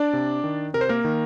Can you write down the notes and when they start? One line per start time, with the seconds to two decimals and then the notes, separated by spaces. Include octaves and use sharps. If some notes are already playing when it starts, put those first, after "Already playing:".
Already playing: D4 D5
0.13 C3
0.44 D#3
0.74 C3 A#4
0.81 C5
0.89 A#3 A#4
1.05 D#3